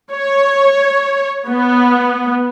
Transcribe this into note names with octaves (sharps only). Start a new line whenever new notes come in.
C#5
B3